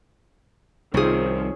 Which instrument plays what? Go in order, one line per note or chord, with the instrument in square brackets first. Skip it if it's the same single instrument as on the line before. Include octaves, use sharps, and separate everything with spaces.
[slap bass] C2 C3 [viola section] D#3 F3 C4 [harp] C#4 G#4